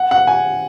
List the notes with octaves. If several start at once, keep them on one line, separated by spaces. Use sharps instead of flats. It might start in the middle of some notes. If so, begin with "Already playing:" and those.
Already playing: F#5
F#5
G#5